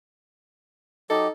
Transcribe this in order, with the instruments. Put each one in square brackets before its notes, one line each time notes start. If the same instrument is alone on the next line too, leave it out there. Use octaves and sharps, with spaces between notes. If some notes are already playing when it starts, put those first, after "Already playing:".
[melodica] F#3 G4 D#5 [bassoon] D#4 [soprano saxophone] A4